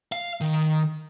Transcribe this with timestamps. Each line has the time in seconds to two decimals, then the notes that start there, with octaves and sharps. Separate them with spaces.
0.12 F5
0.41 D#3